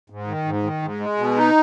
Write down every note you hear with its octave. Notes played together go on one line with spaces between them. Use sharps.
G#2
D#3
G#2
D#3
G#2
G#3
B2
D#4